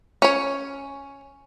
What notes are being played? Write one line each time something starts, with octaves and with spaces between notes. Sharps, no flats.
C#4 C#5